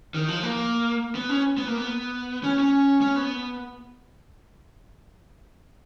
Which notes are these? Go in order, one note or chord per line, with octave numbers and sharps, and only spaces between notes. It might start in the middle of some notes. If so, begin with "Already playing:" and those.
D#3
F3
A#3
B3
C#4
B3
A#3
B3
C#4
C#4
C#4
B3